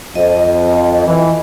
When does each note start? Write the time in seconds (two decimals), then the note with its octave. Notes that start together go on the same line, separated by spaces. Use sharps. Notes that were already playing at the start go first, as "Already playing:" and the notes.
0.15 F2 D#5
1.07 E3